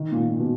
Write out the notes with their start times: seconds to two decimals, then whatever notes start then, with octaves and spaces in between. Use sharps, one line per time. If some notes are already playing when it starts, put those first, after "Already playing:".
Already playing: D#3
0.12 A#2
0.29 A#2
0.39 B2